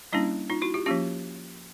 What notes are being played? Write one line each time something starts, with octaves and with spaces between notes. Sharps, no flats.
G3 A#3 C#4 D4 E4
D#4 F4
E4 F#4
F4 G4
F3 A#3 C#4 F4 G4